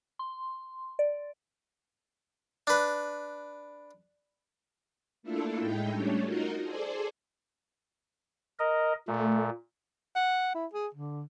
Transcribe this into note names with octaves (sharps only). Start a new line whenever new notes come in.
C6
D5
D4 B4
A3 A#3 D4 E4 F4 A4
A2 G#3 D#4 E4 G5
G3 A3 C#4 D4 C#5
D#4 F4 F#4 A#4 D#5
G#4 A4 C5 D5
A#4 D#5
A#2 A3
F#5
E4
G#4
D3